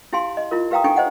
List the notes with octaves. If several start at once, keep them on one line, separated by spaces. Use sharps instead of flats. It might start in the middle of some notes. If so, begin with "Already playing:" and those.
E4 G4 F5 G#5 C6
D#5
E4 F4 A#4
G4 B4 F5 G5 A#5 D#6
D4 D#4 A4 G5 G#5 C#6
C5 D#5 F#5